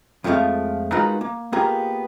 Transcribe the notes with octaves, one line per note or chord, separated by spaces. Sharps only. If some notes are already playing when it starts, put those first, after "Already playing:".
F2 F3 G#3 A3 F5
G#3 D#4 F4 F#4 A#4 B4
A#3
A#3 B3 F4 G4 G#4 A#4